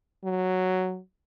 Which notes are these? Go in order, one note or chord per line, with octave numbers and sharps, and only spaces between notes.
F#3